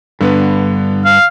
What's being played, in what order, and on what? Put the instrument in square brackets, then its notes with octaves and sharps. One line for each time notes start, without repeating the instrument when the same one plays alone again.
[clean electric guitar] G2 [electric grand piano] D3 B3 B4
[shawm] F5